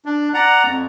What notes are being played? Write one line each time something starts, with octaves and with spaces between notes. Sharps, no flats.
D4
D5 F#5 A#5
F2